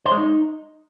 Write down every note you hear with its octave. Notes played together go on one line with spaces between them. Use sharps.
C5
G#3
D#4